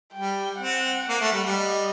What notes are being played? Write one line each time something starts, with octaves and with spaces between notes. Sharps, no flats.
G3 G5
C4 F#5
A#3
A3
G3
G3
D#5